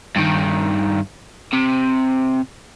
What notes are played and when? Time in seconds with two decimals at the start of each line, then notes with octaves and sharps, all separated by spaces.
0.16 G2 D#3
1.53 C3